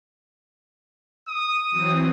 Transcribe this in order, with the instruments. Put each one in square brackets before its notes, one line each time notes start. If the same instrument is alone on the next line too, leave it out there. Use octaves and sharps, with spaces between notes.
[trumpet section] D#6
[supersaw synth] E3 F#3 C4